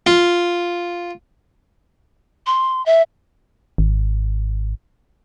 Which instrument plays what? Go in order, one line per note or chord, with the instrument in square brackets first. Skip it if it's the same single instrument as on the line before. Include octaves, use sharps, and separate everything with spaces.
[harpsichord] F4
[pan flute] C6
E5
[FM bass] G#1